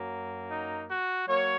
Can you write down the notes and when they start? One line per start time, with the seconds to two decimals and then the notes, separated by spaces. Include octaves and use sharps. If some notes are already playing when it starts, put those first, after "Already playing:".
Already playing: F#2 F#3 A#3
0.51 D#4
0.89 F#4
1.28 F#3 A#3 C#5